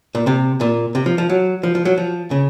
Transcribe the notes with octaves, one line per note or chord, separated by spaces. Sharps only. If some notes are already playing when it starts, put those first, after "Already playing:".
A#2
C3
A#2
C3
F3
F3
F#3
F3
F3
F#3
F3
C#3